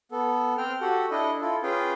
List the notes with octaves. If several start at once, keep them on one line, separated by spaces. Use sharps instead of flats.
B3 A4
C4 C5 G5 F6
F#4 G4 A4 F#5
D4 E4 A4 D#5
E4 F4 A4
C#4 F4 G#4 B4 F5 G5